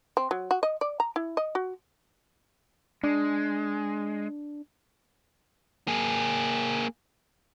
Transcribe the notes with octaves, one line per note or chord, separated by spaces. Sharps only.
C4
F#3
F#4
D#5
D5
A#5
E4
D#5
F#4
G#3 D4
A#3 G#4